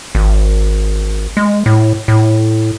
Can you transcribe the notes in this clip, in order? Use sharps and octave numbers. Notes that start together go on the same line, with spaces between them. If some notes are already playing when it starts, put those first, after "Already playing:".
G#1
G#3
A2
A2